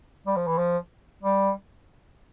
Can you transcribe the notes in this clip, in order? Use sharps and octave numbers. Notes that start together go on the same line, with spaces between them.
G3
F3
E3
F3
G3